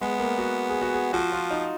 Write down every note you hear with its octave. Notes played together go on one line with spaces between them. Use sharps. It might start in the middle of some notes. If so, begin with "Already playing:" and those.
G#3 B3
A#3
F#4
G#4
F#4
G#4
F3 F#4
F4
D#4